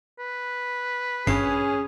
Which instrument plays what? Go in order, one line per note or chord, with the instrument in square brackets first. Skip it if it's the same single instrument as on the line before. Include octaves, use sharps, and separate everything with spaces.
[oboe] B4
[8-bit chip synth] G#1 G2 C7 [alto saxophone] C#4 [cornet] G#4